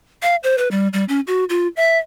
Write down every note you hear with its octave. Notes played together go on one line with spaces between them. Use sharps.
F5
C5
B4
G3
G3
C#4
F#4
F4
E5